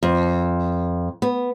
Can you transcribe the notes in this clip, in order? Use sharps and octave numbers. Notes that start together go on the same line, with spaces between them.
F2
B3